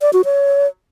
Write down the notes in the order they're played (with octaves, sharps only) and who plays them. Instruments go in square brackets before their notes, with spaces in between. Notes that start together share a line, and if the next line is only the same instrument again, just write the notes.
[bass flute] D5
F#4
C#5